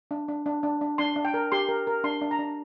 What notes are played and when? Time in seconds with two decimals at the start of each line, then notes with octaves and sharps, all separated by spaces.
0.11 D4
0.28 D4
0.46 D4
0.63 D4
0.81 D4
0.98 D4 C6
1.16 D4
1.25 G5
1.34 A#4
1.52 G4 C6
1.69 A#4
1.87 A#4
2.04 D4 C6
2.21 D4
2.31 A#5
2.39 D4